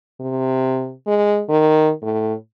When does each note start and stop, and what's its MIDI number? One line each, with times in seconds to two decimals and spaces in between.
0.20 0.93 48
1.07 1.43 56
1.49 1.92 51
2.02 2.34 45